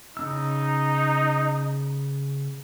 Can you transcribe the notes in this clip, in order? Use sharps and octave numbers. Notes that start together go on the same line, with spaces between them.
C#3 D4 D#4 E6